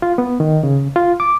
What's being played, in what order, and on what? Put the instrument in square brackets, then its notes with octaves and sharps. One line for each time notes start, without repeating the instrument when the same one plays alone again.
[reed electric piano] F4
B3
D#3
C#3
F4
D6